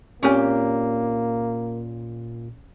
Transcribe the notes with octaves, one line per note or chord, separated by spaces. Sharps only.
A#2 A#3 C4 C#4 G4 A#4 G#5